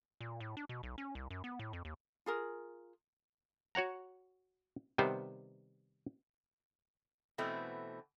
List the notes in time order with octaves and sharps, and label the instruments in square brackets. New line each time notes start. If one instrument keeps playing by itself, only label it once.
[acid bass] A#2
A2
D4
B2
B1
C#4
C2
F#2
B3
A2
F2
D#2
[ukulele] F4 G#4 A#4
[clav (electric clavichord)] F#4 C#5 F#5 A#5
C3 D#3 G3 B3 C5
[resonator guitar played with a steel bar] B2 E3 A3 B3 C4